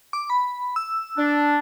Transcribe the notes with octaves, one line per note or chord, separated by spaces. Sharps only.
D6
B5
E6
D4